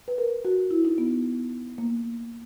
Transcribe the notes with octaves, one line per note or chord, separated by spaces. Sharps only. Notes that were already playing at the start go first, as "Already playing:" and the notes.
B4
A#4
F#4
E4
D#4
B3
A#3